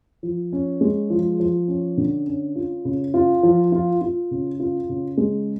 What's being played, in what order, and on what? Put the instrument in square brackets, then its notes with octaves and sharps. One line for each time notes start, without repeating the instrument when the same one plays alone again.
[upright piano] F3
C#4
G#3
F3
F3
C#4
D3
C#4
F4
C#3
F4
F3
F4
F4
C#3
F4
C#3
G#3